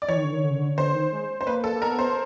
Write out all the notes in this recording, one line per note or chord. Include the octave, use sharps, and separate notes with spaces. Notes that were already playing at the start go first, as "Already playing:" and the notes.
D5
E3 C#5
D#3
D3
D#3
D3
C#3
D3
D3 C5
D#3
G#3
C5
A#3 B4
A4
A#3
B3 A#4
C5